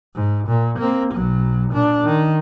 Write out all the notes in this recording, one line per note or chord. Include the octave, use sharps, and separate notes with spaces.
G#2
A#2
A#3 C4
B1 F#3
A#2 D4
D#3